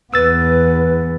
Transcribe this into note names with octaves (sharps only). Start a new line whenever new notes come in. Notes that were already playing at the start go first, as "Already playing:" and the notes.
E2 B3 B4 E6 A6